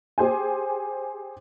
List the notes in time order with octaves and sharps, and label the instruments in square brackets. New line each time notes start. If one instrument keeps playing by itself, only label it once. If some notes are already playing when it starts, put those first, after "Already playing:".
[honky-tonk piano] G4 G#4 C5 G#5